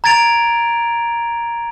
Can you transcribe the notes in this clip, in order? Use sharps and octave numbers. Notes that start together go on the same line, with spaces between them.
A#5 G#6 A6 D7 F7